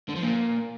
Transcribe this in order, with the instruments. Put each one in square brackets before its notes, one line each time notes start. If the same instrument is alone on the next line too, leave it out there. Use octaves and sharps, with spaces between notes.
[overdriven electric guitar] D3
F3
A#2